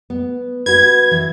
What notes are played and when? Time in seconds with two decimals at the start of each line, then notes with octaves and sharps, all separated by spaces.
0.10 B3
0.66 F#4 B4 G#6
1.11 E3